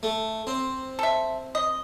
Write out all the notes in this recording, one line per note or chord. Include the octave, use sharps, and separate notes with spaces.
A3
C4
A4 E5
D#5